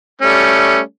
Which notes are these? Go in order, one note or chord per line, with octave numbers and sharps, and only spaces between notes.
G3 A3 C#4